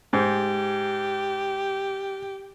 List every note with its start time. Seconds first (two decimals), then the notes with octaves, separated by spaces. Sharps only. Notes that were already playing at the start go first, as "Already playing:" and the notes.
0.13 G#2 G4